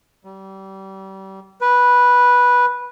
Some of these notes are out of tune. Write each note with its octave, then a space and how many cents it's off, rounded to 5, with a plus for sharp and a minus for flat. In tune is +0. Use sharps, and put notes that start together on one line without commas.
G3 -30
B4 -10